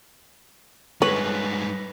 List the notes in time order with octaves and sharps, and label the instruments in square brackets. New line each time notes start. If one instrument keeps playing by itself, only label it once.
[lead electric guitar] G2 G#3 [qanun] B4 [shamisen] C#5